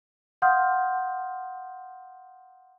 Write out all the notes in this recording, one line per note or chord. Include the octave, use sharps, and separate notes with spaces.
F5 F#5 C6 D#6 F6 G6